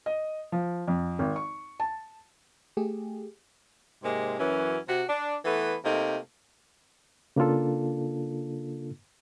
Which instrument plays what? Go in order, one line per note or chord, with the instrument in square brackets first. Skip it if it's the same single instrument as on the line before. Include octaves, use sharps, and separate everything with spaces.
[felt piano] D#5
F3
F2
G#1
C#6
A5
[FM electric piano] A3 G4 G#4
[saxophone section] G#2 C3 G#3 A#3
F#2 E3 F#3 C#4
C3 F#4
D4
E3 A3 B3 B4
C3 A3 A#3 D#4
[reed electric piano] C#3 A#3 D4 F4 A4